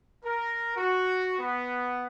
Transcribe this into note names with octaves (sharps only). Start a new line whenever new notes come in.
A#4
F#4
B3